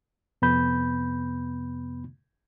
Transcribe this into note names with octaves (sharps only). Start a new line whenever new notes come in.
F2 C3 B3 B5 G6